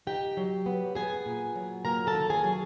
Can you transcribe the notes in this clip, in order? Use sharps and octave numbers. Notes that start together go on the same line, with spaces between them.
D#4 G4 G5
F#3
B3
B3 G#4 G#5
A#2
F#3
A#3 A#4 A#5
A4 A5
D#3
G#4 G#5
F#3